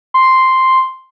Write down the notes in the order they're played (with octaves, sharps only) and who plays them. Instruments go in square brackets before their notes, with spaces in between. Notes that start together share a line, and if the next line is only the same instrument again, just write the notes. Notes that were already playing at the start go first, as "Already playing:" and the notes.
[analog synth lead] C6